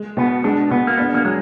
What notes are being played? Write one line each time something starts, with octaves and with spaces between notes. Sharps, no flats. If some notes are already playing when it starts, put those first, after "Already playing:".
Already playing: G#3
B2 B3
G#3 D4
B2 B3
A#3
B3 D4
A#3
F#3 G#3